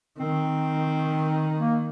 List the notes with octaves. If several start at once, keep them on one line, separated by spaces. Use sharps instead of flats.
D#3 C4
A#3